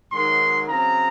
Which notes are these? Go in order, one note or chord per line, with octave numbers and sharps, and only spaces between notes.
G#2 D#3 F#3 C6
C#3 F#3 C4 A#5